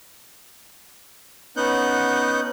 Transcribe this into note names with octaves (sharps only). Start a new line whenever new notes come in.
B3 C#4 D#4 F#5 F#6 G6